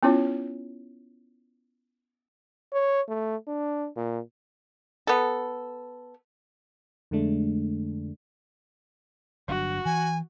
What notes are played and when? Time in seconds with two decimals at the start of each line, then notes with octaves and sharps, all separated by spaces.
0.03 B3 C#4 E4 F4 C#5
2.73 C#5
3.08 A3
3.48 D4
3.96 A#2
5.07 B3 A4
7.11 F2 D3 G#3 A3 D4
9.48 G1 F#3 D4 F#4
9.85 E3 G#5